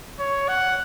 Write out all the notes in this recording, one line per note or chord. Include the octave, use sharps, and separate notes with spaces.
C#5
F#5